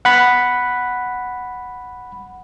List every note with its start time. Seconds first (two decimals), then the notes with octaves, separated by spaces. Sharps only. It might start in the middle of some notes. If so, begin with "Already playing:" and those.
0.05 F#5 B5